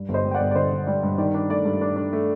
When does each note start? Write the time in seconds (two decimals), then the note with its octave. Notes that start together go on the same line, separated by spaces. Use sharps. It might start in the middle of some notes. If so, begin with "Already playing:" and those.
Already playing: G2
0.09 G1
0.14 C5 D#5
0.25 G3
0.31 G5
0.35 D5 F#5
0.41 G1
0.51 D5
0.55 D3 C5 D#5
0.72 D3
0.87 G3 D5
1.03 G2
1.18 D#3 D5
1.34 D4
1.49 A3 D5
1.65 G2
1.81 D4
1.96 D4
2.13 A3